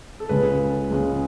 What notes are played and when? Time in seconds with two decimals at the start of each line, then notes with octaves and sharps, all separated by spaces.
0.20 A4
0.29 C#2 C#3 G#3 C#4 B4
0.91 C#2 C#3 G#3 C#4